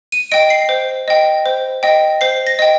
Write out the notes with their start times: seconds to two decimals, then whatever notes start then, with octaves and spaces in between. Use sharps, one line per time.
0.12 D#7
0.31 D#5 G5 D7
0.50 C7
0.69 C5
1.08 D#5 G5
1.46 C5
1.83 D#5 G5
2.21 C5 C7
2.47 A#6
2.59 D#5 G5